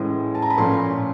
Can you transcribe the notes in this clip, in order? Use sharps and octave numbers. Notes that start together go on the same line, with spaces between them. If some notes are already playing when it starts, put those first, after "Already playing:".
Already playing: A2 E3 G#3 C#4
A5
A#5
B5
A#2 F3 A3 C#4 C6